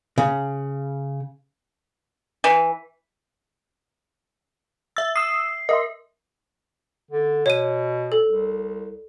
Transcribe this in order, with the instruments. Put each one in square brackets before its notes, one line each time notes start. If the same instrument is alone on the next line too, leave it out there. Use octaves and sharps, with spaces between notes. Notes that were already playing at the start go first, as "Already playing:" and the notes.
[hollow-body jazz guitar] C#3
[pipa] E3
[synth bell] E5 E6 [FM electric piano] A6
[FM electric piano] D#6 E6 [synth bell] C7
[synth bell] A#4 [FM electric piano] D#5 E5 C6
[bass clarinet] D3
[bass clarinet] B2 [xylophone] C#5 D#7
[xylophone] A4
[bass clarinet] C2